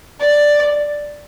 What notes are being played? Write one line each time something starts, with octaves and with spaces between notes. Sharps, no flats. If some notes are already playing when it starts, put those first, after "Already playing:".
D5